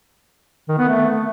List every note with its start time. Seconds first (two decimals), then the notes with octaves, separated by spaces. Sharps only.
0.69 D#3
0.79 B3
0.89 A3